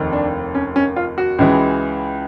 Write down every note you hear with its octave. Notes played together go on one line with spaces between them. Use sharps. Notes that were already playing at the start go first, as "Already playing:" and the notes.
Already playing: F1 D#2 D#3
D4
C#4
C#4
F4
F#4
C#2 C#3 E3 G#3